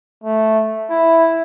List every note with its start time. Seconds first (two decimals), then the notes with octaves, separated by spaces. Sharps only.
0.24 A3
0.90 E4